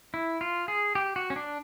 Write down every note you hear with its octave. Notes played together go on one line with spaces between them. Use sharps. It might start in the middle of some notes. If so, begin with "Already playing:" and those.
E4
F4
G#4
G4
F#4
C#4
D4